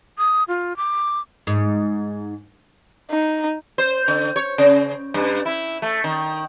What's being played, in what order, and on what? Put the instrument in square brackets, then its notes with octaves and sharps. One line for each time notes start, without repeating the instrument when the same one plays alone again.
[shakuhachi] D#6
F4
D6
[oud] G#2
[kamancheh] D#4
[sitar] C5
D3
C#5
C#3
G2
E4
A3
D#3